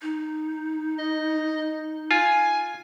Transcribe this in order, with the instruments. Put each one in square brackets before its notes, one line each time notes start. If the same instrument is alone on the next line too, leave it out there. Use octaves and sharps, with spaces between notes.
[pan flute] D#4
[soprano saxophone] D#5
[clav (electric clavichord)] F4 [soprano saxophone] G#5